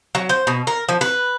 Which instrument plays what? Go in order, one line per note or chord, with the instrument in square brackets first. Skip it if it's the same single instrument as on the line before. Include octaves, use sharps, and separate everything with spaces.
[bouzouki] F#3
C5
B2
A#4
F3
B4